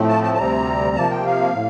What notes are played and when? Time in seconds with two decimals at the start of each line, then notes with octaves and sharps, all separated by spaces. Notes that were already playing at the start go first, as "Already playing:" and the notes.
Already playing: A2 F3 A3 C4
0.09 A5
0.24 A5
0.34 A5
0.38 D2 C3 G3 C4 A#5
0.96 C3 F3 A#3 A5
1.10 G5
1.26 F5
1.54 A2